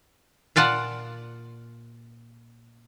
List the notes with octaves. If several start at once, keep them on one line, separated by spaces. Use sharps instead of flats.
A#2 F4 D5 F#5 A5